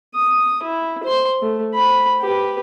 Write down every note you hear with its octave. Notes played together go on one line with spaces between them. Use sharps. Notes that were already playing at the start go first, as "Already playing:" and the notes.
D#6
E4
C5 C6
A3
C5 B5
G4 B4